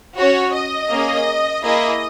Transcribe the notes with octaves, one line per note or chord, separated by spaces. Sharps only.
C#4 F#4 C#5
D#5
A#3 C#4 G#4
A#3 E4 G#4 D#5